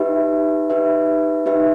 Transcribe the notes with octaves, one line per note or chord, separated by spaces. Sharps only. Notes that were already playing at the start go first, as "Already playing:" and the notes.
Already playing: D#4 G4 B4 E5
D#4 G4 B4 E5
D#4 G4 B4 E5